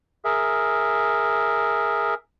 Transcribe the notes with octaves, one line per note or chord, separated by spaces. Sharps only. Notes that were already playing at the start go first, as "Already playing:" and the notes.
G#4 A#4 E5